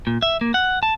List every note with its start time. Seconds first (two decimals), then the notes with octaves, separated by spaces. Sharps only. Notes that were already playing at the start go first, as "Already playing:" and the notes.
0.07 A#2
0.22 E5
0.41 A#3
0.54 F#5
0.83 A5